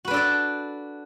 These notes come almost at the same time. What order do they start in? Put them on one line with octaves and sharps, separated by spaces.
F#4 B4 D4 A4 D5